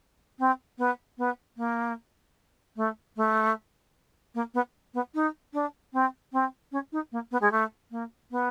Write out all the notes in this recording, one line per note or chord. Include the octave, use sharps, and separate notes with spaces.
C4
B3
B3
A#3
A3
A3
A#3
B3
B3
D#4
D4
C4
C4
C#4
D#4
A#3
B3
G#3
A3
A#3
B3